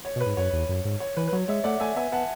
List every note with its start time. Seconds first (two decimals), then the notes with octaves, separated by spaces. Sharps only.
0.05 C#5
0.16 B2
0.21 B4
0.26 G#2
0.37 F#2 C#5
0.53 E2
0.69 F#2
0.85 G#2
1.00 C#5
1.17 E3 B4
1.28 B4
1.33 F#3 C#5
1.48 G#3 C#5 E5
1.64 A3 D5 F#5
1.80 A3 E5 G#5
1.96 B3 E5 G#5
2.12 B3 F#5 A5